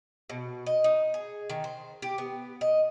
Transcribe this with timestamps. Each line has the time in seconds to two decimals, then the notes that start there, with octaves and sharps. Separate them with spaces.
0.30 B2
0.66 D#5
0.84 D#4
1.14 G#4
1.50 D#3
1.64 C5
2.02 G4
2.18 B3
2.61 D#5